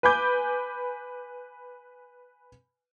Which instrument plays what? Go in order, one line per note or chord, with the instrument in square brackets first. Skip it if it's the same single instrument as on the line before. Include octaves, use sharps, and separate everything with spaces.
[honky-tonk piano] B4 G#5 B5 D6 G6